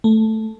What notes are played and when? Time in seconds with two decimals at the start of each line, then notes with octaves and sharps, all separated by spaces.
0.04 A3